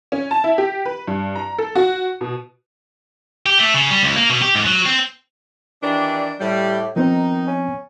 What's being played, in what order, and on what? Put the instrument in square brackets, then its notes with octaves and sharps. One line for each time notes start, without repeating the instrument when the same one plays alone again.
[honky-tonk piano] C#4
A5
E4
G4
B4
G2
A#5
A4
F#4
B2
[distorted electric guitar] G4
A3
C#3
G3
C#2
A#3
B2
G4
G#2
F#3
C4
[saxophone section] D#3 E3 D4 [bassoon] G4
[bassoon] A2 [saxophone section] G3
[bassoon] D#3 [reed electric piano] F3 B3 C4 [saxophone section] D#4
[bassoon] C#4